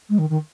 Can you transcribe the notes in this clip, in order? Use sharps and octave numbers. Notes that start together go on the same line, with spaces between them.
G#3
D#3
D#3